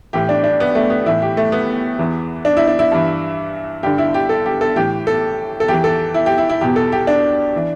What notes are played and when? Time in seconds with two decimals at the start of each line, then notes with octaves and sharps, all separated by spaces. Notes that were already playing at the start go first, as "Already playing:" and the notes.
0.13 A2 E3 G4
0.29 D4
0.44 D4
0.60 B3
0.75 A3
0.90 B3
1.06 A2 E3 E4
1.22 G4
1.37 A3
1.52 B3
1.99 E2 E3
2.45 D4
2.57 E4
2.68 D4
2.79 E4
2.92 G2 E3
3.83 G2 D3 G4
3.98 E4
4.14 G4
4.29 A4
4.46 G4
4.61 A4
4.76 A2 E3 G4
5.07 A4
5.60 A4
5.68 E2 E3 G4
5.84 A4
6.14 E4
6.26 G4
6.38 E4
6.49 E4
6.61 E2 B2 G4
6.76 A4
6.92 G4
7.07 D4
7.56 E3